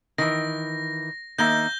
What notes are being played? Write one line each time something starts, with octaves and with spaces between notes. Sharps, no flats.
D#3 E3 A#6
D#3 A#3 E5 G6 A#6 G7